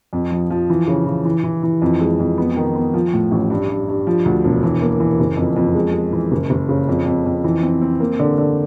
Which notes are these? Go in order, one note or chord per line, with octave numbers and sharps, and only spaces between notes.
F2
F3
F3
E3
C#3
E3
E3
E3
E3
F2
G#3
F2
B3
D#3
B3
F3
A2
A1
G2
G2
G2
F3
D2
E1
E3
A#3
E3
F#1
F2
F2
G#3
G#3
E3
F#1
F#1
C#3
F2
F2
F2
E3
C4
C4
A#3
D3
D3